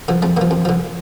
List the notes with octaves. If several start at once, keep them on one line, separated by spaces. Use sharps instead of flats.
D3 F3
F2 A3
D3 F3 A#3
F2
D3 F3